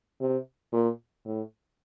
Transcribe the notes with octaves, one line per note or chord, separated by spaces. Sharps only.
C3
A#2
A2